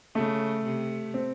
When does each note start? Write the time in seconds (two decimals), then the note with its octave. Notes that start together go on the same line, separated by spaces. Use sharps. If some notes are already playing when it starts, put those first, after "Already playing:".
0.15 C#3 A3
0.65 C3
1.14 C4